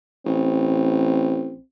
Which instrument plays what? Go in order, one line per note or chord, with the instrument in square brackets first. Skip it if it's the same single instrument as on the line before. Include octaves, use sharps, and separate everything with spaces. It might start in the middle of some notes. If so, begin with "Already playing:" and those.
[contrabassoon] A1 [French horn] C4